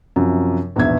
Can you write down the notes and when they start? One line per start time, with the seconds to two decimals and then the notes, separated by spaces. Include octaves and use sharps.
0.16 F#2 C3 F3
0.76 A#1 E2 G#2 B2 E5 G#6